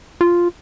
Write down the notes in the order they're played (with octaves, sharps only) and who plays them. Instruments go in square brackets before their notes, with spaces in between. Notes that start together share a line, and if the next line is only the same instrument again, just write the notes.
[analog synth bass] F4